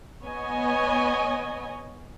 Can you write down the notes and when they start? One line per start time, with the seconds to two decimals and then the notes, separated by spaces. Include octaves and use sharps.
0.24 B3 C#5 D#5 G#5